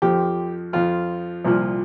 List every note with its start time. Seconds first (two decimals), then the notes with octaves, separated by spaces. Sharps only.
0.02 F2 F3 G4
0.73 F2 F3 F4
1.45 C2 A#2 F3